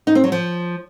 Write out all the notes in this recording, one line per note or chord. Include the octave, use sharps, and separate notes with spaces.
D#4
C4
F#3
F3